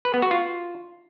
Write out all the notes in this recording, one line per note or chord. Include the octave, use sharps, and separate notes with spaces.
B4
B3
F#4
F4